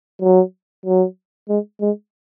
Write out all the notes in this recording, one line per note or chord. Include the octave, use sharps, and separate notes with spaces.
F#3
F#3
G#3
G#3